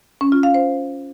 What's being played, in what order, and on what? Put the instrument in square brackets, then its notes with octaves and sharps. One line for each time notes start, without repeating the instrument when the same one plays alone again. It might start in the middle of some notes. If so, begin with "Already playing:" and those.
[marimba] C#4
F4
F5
C5